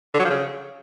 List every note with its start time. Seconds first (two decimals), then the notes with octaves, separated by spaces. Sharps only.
0.14 D3
0.19 F#3
0.25 F3
0.30 C#3